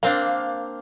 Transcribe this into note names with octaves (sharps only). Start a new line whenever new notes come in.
A#3 C4 D4 F5